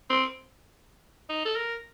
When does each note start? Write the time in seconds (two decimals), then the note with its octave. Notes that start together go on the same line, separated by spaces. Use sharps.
0.10 C4
1.29 D#4
1.45 A4
1.56 A#4